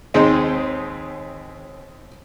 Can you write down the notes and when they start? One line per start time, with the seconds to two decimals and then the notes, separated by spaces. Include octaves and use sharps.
0.14 D#2 G#3 C4 D#4